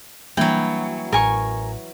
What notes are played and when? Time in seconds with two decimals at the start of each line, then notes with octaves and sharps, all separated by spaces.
0.37 E3 F#3 G3 A#3 D4 G5
1.12 A1 A#4 G#5 C#6